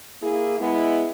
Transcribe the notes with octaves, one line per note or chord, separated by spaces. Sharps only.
A#3 E4 G#4
G#3 B3 E4